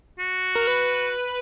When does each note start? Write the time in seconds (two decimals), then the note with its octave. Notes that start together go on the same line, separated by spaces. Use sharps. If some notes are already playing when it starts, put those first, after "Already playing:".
0.19 F#4
0.55 A#4
0.67 B4